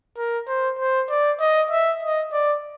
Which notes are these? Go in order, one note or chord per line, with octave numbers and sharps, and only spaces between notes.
A#4
C5
C5
D5
D#5
E5
D#5
D5